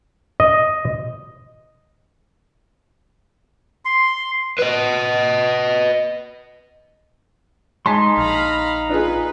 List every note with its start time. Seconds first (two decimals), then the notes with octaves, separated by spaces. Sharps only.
0.40 D#5
3.85 C6
4.59 B4 D#5
7.86 G#3 D#4 G#5 A5 C6 B6
8.18 A#1 F5 A#5 B5
8.90 D4 F4 G#4 B4